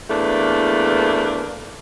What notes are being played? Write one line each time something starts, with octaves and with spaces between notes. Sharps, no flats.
E2 A3 A#3 D4 B4